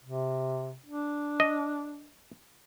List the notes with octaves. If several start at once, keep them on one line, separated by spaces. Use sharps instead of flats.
C3
D4
D#5